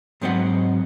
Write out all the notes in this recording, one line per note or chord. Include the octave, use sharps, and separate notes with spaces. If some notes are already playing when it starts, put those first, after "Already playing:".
G#2 F#3 C4 B4 D#5 F#5